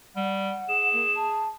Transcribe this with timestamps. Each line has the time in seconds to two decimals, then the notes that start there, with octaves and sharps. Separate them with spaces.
0.16 G3 F#5
0.69 G#4 E7
0.93 A#3
1.15 A5